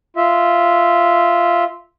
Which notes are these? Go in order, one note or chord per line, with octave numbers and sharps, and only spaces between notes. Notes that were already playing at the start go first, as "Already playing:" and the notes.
F4 E5